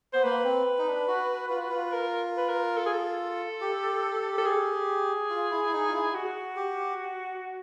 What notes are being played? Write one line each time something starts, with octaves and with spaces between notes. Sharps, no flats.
B3 C5
A#3 B4
C4
D#4
D4
F#4
F4
F#4
F4
A#4
B4
A#4
A4
G#4
A4
G4
A4
G#4
F4
E4
E4
D#4
F4
E4
F#4
G4